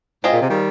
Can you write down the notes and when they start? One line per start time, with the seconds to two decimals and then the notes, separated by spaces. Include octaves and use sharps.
0.24 G#2 C4 F4 G#4 D#5
0.33 A#2
0.42 C3
0.50 D#3 G3